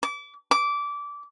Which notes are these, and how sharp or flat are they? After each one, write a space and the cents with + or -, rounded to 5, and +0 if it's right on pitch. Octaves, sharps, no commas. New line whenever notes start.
D6 -30
D6 -20